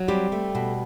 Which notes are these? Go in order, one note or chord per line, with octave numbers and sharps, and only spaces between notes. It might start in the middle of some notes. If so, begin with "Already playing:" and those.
Already playing: F#3
G3 C4 G4
A3
B2